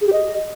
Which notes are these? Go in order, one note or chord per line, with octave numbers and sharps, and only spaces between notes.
G#4
G4
D#5